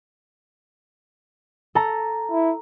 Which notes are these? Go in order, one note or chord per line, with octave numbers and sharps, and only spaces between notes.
A4 A#5
E4